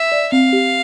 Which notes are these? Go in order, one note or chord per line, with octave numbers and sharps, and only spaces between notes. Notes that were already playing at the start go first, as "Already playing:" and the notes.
Already playing: E5
D5
C4 F5
G4